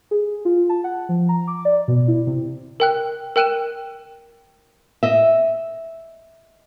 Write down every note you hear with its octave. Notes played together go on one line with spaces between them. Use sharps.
G#4
F4
A5
F#5
F3
A#5
D6
D5
B2
E4
C3
A#4 G5 F#6
A#4 G5 F#6 D#7 E7
D#5 E5